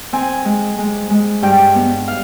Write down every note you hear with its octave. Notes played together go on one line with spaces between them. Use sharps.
C4 G#5
G#3
G#3
G#3
G2 G5
B3
F5